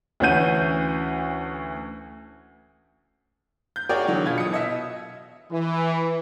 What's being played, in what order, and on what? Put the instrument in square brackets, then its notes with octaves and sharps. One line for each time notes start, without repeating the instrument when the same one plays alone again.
[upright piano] D2 E3 C#4 F#5 G6 D#7
G6
F#4 G#4 A#4 C#5 D5 G5
D3 E3 F#3 C#5
B2 F4 G#6
D#6 C#7
B2 D#5 E5
[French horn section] E3